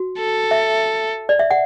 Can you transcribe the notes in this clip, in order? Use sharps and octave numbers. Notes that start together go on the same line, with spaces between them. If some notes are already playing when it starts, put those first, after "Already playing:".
Already playing: F#4
A4
E5
D5
E5
F#5